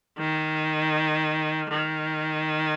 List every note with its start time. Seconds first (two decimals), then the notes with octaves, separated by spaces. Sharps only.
0.18 D#3
1.71 D#3